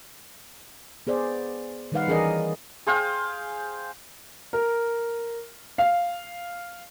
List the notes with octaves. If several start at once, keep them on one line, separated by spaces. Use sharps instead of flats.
B3 G#4 C5 D5
D#3 G3 D#4 B4 F5 F#5
E3 C#4 G#4 A#4 D5 D#5
G#4 C5 F5 G5
A#4
F5